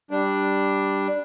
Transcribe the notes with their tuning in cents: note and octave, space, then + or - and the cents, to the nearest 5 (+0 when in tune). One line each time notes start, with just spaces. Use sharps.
G3 +0 D4 +0